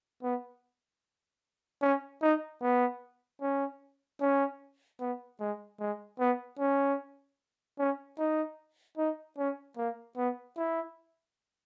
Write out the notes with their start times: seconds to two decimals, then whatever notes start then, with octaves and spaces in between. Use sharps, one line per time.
0.23 B3
1.82 C#4
2.22 D#4
2.62 B3
3.41 C#4
4.21 C#4
5.00 B3
5.40 G#3
5.80 G#3
6.20 B3
6.59 C#4
7.79 C#4
8.18 D#4
8.98 D#4
9.38 C#4
9.77 A#3
10.17 B3
10.57 E4